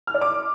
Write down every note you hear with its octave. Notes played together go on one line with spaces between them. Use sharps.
F6
D5
D6